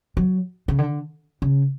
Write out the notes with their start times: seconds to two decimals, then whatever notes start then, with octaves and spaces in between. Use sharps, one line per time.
0.17 F#3
0.68 C#3
0.78 D3
1.42 C#3